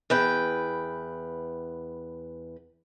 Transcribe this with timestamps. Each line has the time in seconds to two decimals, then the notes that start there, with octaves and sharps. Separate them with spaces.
0.10 E2 B4 G5